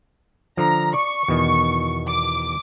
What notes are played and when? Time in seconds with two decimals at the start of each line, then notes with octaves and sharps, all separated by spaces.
0.57 D3 F3 A#5
0.94 D5 C#6
1.28 E2 B2 D#3
2.09 D6